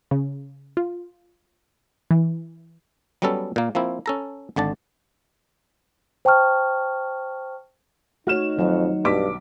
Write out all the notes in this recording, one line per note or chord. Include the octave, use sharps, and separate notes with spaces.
C#3
F4
E3
F#3 G3 B3 C#4 A4
A#2 A#3
F3 A#3 C4 E4
C#4 A4 A#5
G#1 D3 D5 A5
C5 G5 A5 C#6 F6
A3 D#4 F#4 C#5 F6 E7
F2 D#3 F#3 F#5
B1 G2 D6 B6